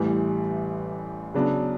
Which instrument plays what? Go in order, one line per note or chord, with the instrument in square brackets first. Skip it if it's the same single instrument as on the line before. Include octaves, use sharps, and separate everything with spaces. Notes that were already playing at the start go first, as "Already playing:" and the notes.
Already playing: [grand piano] A1 A2 E3 G3
C#3 F#3 B3 D4